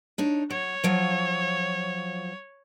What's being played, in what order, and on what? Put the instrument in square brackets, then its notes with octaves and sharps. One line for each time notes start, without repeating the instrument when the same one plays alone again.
[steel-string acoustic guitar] D4 D#4 C#5
[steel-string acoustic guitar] F#3 [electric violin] C#5
[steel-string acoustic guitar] F3 F#3 F4